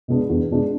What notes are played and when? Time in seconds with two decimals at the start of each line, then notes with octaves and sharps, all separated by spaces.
0.08 B2 G#3 B3 D4
0.30 E2
0.51 B2 G#3 B3 D4